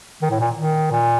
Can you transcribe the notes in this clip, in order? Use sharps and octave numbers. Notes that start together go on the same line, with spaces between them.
D#3
A2
A#2
D#3
A#2